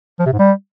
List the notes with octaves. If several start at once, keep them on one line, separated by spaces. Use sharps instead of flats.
F3
C3
G#2
G3